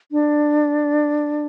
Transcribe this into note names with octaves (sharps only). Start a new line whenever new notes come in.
D4